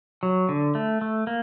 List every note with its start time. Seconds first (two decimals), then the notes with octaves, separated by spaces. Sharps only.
0.23 F#3
0.49 D3
0.75 A3
1.01 A3
1.27 A#3